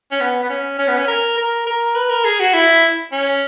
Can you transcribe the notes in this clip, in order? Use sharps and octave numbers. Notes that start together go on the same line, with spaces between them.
C#4
B3
B3
C#4
C#4
B3
C#4
A#4
A#4
A#4
B4
A#4
G#4
F#4
E4
C#4